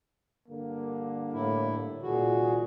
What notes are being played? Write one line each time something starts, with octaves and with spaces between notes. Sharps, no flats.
G2 D3 A#3
A2 E4
C2 A#2 D#3 F#4 G#4